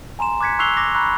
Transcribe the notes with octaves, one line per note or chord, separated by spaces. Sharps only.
G#5 A#5 C6 E7
D6 F#6 G#6 B6 C#7
C#6 E6 F#6 C7 F7 G7
D6 A#6
A#5 B5 C#6 F#6